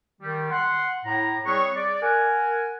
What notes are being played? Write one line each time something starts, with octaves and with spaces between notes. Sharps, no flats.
D#3 G3
F#5 C6
A2 A#5
G3 C4 G#4 B4 C#5 C#6
D5
A#4 F#5 G#5